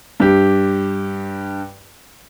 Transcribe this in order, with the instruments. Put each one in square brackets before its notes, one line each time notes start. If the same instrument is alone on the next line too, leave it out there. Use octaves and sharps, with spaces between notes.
[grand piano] G2 G4